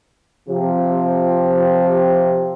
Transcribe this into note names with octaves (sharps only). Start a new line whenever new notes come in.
C3 F3 G4